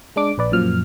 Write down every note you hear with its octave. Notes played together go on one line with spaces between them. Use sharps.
G#3 D4 D6
A#1 B4 D5
F#2 A#2 F3 F6